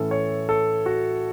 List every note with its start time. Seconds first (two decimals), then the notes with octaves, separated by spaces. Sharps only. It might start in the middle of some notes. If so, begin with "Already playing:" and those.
Already playing: A2 E3 A3 C#4 A4
0.11 C#5
0.49 A4
0.86 F#4